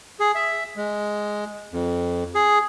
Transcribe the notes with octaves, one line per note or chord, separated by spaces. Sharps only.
G#4
E5
G#3
F2
G#4